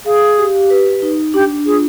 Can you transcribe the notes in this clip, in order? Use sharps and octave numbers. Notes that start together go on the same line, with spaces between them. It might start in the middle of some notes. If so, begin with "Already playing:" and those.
G#4 F5
G4
B4
D#4
D4 G4
F4 G#4